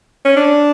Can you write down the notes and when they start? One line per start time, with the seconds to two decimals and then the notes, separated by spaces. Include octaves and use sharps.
0.25 C#4
0.37 D4